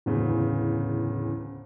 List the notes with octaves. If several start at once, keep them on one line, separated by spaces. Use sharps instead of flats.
D1 E2 C#3